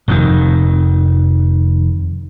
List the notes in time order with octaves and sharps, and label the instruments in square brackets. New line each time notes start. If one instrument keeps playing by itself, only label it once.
[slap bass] F1 F2 C3 D#3